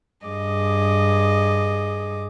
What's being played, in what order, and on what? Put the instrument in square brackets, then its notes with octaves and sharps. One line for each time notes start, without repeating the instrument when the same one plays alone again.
[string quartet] G2 G#4 D#5 D6